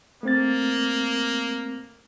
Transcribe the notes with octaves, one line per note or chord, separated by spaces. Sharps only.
A3 A#3 C4 A6